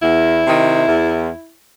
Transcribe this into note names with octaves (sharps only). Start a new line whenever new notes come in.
E2 E4
C3 D#3
E2